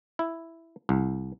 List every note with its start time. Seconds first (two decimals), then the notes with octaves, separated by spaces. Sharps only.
0.19 E4
0.89 C2